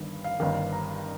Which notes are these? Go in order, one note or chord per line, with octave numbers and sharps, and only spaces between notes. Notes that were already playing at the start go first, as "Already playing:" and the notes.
Already playing: G1 G2 D#3
F5
G1 G2 D#3
A#5